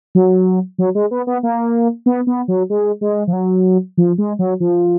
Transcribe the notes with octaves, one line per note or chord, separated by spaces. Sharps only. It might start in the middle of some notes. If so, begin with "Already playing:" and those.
F#3
F#3
G#3
B3
B3
A#3
B3
B3
F#3
G#3
G#3
F3
F#3
F3
G#3
F#3
F3